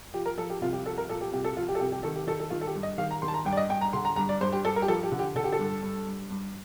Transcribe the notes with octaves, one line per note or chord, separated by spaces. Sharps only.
F3 G4
A#4
F3 A4
G4
C2 F4
G4
F3 A4
A#4
A#2 A4
G4
C2 G4
A4
F3 F4
G4
A4
C2 G4
G4
D#3 A4
G4
D#3 A4
A4
D#3 F4
A4
G4
G2
D#5
D#3 F5
A#5
D#3 C6
A5
A#5
G2 G5
D5
D#5
G2 G5
A#5
D3 C6
A#5
G2 A#5
D5
G2 C5
G4
G2 A4
A#4
G4
F3 A4
G4
D3
G4
D3 A4
G4
A4
G2
G2
G2
G2